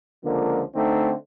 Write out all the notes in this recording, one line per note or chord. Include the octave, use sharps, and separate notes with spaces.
C#2 D3 F3 A#3
D3 A3 C4 D#4